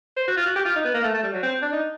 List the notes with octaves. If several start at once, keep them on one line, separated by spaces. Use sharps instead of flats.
C5
F#4
F4
F#4
G4
F4
D#4
B3
A#3
A3
A3
G3
F#3
C4
D4
D#4